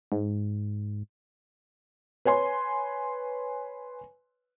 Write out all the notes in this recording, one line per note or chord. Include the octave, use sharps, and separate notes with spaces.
G#2
B4 C#5 G#5 C6